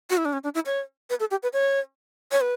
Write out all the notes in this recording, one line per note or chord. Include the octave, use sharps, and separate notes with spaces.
F#4
E4
D4
C#4
D4
E4
C#5
B4
A4
G4
B4
C#5
C#5
B4